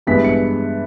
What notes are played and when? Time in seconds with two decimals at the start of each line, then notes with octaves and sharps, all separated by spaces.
0.07 G2 E3 G#3 B3 B6
0.24 C#7